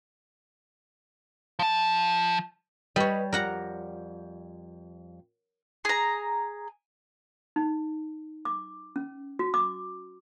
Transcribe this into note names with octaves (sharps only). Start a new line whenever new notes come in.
F3 A5
G3 B4 C#5 D#5
F2 G3 A#4 F#5 A#5
G#4 A#5
D#4
D6
C#4
F#4
D6